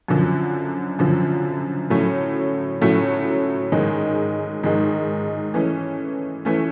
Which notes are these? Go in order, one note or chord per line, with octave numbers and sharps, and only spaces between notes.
F#2 D3 F3
F#2 D3 F3
A2 F#3 A3 C#4
A2 F#3 A3 C#4
G#2 D#3 G#3
G#2 D#3 G#3
E3 A3 C#4
E3 A3 C#4